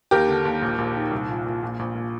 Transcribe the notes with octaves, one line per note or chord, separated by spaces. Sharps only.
D#2 G4 A#4
D3
D#2
A#1
A#1
D#3
C2
A#2
A#2
A#1
A#1
A#2